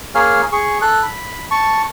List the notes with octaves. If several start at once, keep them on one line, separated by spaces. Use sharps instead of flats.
A#3 G#4 C#5 F5 G#5 F6
G#4 C#6
A4 F#6
B5
A5 C#6